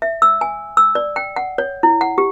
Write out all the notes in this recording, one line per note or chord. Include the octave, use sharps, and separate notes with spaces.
E5
E6
G#5
E6
D5
G5
F#5
C#5
E4
F#5
G4